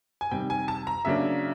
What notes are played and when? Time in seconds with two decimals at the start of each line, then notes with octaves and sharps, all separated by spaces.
0.21 G#5
0.31 C3 D#3 G3 G5
0.50 G#5
0.68 A5
0.87 A#5
1.05 C#3 F#3 A#3 D4 E5